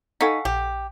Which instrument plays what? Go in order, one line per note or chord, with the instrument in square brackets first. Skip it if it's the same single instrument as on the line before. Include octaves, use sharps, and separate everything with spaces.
[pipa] D#4 [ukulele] A4 F5 F#5 [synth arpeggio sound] G#5 C#6 B6
[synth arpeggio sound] A#1 [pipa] G4